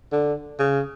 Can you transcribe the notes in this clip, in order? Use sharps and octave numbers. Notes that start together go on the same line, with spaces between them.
D3
C#3